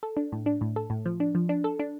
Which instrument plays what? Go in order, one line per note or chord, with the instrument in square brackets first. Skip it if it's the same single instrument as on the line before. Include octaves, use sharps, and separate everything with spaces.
[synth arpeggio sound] A4
D4
A2
D4
A2
A4
A2
F3
D4
F3
D4
A4
D4